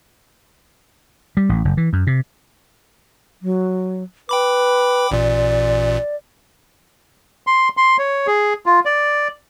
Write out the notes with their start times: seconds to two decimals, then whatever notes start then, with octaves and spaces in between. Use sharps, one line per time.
1.37 G3
1.49 A1
1.65 F#1
1.77 E3
1.93 F#2
2.07 C3
3.42 F#3
4.29 B4 G5 B5 D6
5.11 A1 A#2 D5
7.47 C6
7.77 C6
7.99 C#5
8.27 G#4
8.66 F4
8.85 D5